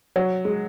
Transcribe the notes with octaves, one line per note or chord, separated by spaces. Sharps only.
F#3
G#3